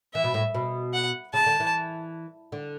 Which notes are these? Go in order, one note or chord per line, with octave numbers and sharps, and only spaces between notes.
E3 E5
B2
A2
B2
F#5
C#3 A5
D3
E3
D3